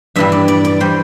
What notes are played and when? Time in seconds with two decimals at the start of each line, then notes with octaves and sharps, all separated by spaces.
0.16 G2 E3 G3 E5
0.32 D5
0.48 D5
0.65 D5
0.80 E3 G3 C5